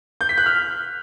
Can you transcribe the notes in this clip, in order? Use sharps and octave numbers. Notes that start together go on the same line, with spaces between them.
G6
B6
F#6
F6